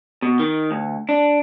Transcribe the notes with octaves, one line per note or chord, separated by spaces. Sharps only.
B2
D#3
D2
D4